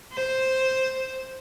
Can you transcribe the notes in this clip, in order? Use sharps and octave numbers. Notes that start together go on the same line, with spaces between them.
C5